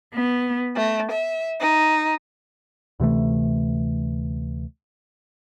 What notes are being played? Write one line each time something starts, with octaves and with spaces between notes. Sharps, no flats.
B3
A3
E5
D#4
D2 C3 E3 A3